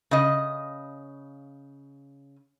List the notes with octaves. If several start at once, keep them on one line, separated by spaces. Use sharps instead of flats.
C#3 D#5